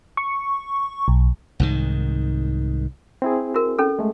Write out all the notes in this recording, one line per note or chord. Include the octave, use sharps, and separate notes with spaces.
C#6
B1
C2 G#2 D#3
C4 E4 G#4
F#4 A#4
C#4 A4
G#3 A3